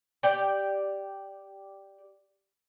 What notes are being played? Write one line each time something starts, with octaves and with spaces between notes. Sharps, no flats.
G4 D5 G5